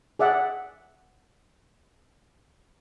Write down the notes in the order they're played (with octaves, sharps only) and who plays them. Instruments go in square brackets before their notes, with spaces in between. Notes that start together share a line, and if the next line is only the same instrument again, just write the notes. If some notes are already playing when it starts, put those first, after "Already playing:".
[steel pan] G#4 D5 E5 F#5